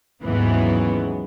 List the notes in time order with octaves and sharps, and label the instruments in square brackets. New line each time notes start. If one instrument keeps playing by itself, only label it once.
[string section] D#2 G#2 C#3 E3 F#3 B3